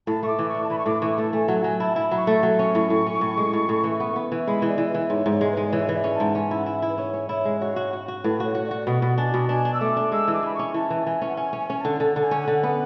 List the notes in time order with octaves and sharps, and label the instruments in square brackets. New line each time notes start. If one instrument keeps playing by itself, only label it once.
[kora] A2 [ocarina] A5
[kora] A3 [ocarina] C#6
[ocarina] D6
[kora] E3
[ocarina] C#6
[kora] D4
[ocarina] A5
[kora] E3 [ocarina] B5
[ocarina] C#6
[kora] A2 [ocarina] D6
[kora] E3 [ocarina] C#6
[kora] A3 [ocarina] A5
[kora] A3 [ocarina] G#5
[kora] F#3 [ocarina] F#5
[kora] F#3 [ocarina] G#5
[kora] E4 [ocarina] A5
[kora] E4 [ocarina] B5
[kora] F#3 [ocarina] B5
[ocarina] C#6
[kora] A3
F#3
[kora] C#4 [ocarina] C#6
[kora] A2
A2
C#4
A2
G#3
A2
A2
E3
B3
B3
E3
[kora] G#3 [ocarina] B5
[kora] E3
[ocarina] D5
[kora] E3
[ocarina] B4
[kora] E3
[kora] G#2 [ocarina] C#5
[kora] G#2
[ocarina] C#5
[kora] G#3
[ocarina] B4
[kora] G#3
[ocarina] D5
[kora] E3 [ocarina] C#5
[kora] E3
[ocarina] D5
[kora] C#4
[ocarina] G#5
A5
[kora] G#2
[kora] C#4 [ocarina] G#5
[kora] E4
[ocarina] F#5
[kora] E4
[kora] E4 [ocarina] E5
[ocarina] B4
[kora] C#4 [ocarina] C#5
[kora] C#4
[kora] E4 [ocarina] C#5
[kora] G#3
[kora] F#4 [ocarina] C#5
[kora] F#4
F#4
F#4
[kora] A2 [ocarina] B4
[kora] F#4 [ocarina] C#5
[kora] F#4
[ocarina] D5
[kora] F#4
[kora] B2 [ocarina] F#5
[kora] B2
[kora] D4 [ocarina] G#5
[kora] B2
[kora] D4 [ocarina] G#5
[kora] D4
[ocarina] E6
[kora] A3 [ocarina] D6
[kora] D4
[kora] G#3 [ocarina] E6
[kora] E3
[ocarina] D6
[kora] E3 [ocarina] B5
[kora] C#4 [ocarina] C#6
[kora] E3 [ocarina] A5
[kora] E3
[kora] E3 [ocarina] G#5
[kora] C#4
[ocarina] F#5
[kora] C#4 [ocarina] G#5
[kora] C#4
[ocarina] G#5
[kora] C#4
[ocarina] A5
[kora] D3
[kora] D3 [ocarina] A5
[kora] D3 [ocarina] A5
[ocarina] G#5
[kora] C#4
[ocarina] F#5
[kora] D3
B3